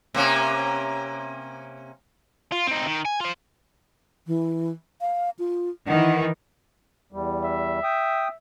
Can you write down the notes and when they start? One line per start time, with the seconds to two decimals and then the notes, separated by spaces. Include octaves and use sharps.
0.14 C3 A#3 C#4
2.52 F4
2.67 C4 D#4
2.87 D#3
3.05 G#5
3.21 F4 C5
4.27 E3
5.01 F5
5.39 F4
5.88 D#3 E3 F#5
7.12 E2 G3
7.45 E5
7.84 G5 D#6